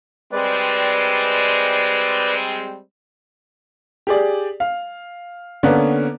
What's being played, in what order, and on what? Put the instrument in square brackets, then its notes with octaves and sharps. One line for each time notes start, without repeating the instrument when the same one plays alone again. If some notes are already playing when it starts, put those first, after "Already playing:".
[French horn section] G3 G#3 C4 [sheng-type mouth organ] B4 D5
[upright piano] G4 G#4 D5
F5
D3 A#3 B3 C#4